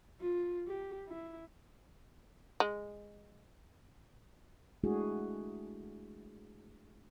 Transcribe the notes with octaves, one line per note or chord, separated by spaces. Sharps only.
F4
G4
E4
G#3
G#3 A3 D4 E4 F#4 G#4